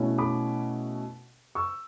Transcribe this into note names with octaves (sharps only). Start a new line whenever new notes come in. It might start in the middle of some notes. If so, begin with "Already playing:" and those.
Already playing: B2 A3 C#4 E4
B5 D6
C#6 E6